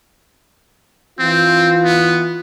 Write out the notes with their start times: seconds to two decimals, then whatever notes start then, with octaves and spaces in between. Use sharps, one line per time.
1.19 E3 C4 F4
1.85 B3